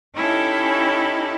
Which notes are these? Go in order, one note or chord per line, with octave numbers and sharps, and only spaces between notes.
C#4 D#4 E4 G4 A4